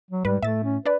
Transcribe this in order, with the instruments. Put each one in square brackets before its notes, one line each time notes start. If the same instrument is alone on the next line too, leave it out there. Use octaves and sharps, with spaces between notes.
[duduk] F#3
[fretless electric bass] G#2 [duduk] G3 [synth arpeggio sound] B4
[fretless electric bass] A2 [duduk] A3 [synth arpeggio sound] E5 A6
[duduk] C#4
[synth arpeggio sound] D4 D5 [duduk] B4